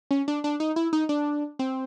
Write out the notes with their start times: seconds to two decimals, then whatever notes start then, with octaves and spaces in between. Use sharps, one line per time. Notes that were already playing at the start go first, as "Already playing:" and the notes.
0.11 C#4
0.28 D4
0.44 D4
0.60 D#4
0.76 E4
0.93 D#4
1.09 D4
1.59 C4